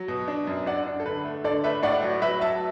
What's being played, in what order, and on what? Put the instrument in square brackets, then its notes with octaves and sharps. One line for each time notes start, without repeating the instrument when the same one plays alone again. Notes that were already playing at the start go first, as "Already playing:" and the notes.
Already playing: [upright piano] F#3
B2
D4
F#2
D4 D5 F#5
D4
A4
D3 B4
A3
D3 A4 D5
A3 B4 E5
A2 D5 F#5
F#3
F#3 B4 E5
F#3 E5 A5